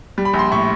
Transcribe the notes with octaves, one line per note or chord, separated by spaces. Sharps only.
G3
B5
A#1
C6
A2 B5 C#6